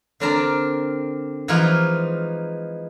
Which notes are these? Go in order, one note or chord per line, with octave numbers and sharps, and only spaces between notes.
D3 C4 D4 A#4 D5 A#5
E3 F3 G#3 D#4 F4